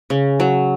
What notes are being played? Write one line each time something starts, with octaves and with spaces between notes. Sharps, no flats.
C#3
F#3